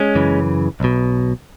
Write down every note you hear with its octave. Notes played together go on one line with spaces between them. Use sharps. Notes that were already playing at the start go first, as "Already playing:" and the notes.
Already playing: G#3 C#4
F#2 C#3 E3
B1 B2